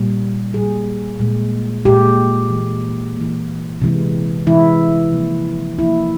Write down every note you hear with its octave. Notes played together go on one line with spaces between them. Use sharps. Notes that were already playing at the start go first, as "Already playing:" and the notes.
Already playing: A#2 G3 A#3
A#2 G3 A#3 G#4
A#2 G#3
A#2 G#3 G4
E3 A#3
E3 A#3
C3 E3 G#3
C3 E3 G#3 E4
C3 F3 A#3
C3 F3 A#3 E4